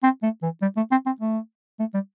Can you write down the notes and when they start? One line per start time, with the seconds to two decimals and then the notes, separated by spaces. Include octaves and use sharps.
0.03 C4
0.23 A3
0.43 E3
0.62 G3
0.77 A3
0.91 C4
1.06 C4
1.20 A3
1.80 A3
1.94 G3